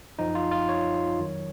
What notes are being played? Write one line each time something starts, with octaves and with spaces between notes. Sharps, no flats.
F#2 F3 D#4
F4
F4
C#5
F2 D#3 F#3